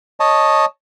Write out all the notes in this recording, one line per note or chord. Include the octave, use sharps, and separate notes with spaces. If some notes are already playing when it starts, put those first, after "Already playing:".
C#5 D#5 A5